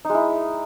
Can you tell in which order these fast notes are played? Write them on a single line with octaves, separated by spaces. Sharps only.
D#4 G#3 E4